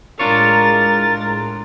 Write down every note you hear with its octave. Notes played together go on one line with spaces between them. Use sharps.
A2 G#3 D4 F4 A#4 C#5 A6